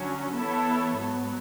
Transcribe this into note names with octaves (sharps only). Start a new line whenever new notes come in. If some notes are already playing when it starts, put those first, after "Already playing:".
Already playing: D3 F#3 C#4
E3 B3 E4 A4 C#5
G#2 F#3 B3